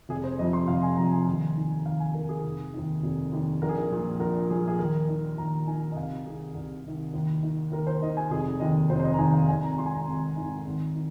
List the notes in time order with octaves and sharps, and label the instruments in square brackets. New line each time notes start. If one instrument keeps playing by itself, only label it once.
[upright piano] F1 G#4
C5
F2 C3 F3 D#5
C6
F1 F5
G#5
F2 C3 F3 A#5
G#5
D#2
D#3
D#2 F5
G#5
D#3 A#4
G#4
F1
D#2 D#3
F1
D#2 D#3
A#1 A#4
G#4
A#4
A#2 F3
A#1 A#4
A#2 F3 G#4
G#4
D#2 A#4
D#3
D#2 A#5
D#3 G#5
D#5
C2 F5
C3 D#3 G#4
C2
C3 D#3
D#2
D#3
D#2 A#4
C5
D#3 D#5
G#5
F1 G#4
D#2 D#3 D#5
F1 C5
C5
D#5
A#5
D#2 D#3 G#5
F5
G#1 G#5
A#5
G#2 D#3 C6
G#5
A#5
G#1
G#2 D#3
G#1
D#3